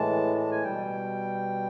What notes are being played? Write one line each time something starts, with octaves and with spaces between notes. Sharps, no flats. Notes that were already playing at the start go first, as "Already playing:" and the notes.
Already playing: A2 E3 G#3 A5
A5
G#5
B2 G3 G5